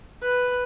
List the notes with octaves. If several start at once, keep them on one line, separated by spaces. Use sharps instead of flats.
B4